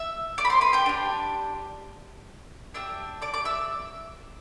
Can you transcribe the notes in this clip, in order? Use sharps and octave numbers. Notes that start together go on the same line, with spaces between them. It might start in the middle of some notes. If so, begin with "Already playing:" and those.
Already playing: E5 E6
D5 D6
B5
C5 C6
B4 B5
G4 G5
D4 G4
D4 G4 E5 E6
D5 D6
D5 D6
E5 E6